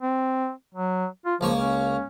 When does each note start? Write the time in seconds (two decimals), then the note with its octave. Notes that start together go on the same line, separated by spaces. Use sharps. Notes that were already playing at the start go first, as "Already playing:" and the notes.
0.01 C4
0.74 F#3
1.26 F4
1.41 C#2 F3 A#3 C#6
1.58 C#4